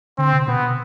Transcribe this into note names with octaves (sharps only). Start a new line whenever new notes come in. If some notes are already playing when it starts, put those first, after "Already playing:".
D3 C4
C3
B2 B3